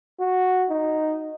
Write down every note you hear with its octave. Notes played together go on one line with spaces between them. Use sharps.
F#4
D#4